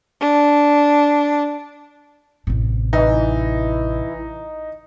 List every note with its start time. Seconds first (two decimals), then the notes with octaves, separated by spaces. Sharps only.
0.21 D4
2.47 A1 C3
2.93 E3 D#4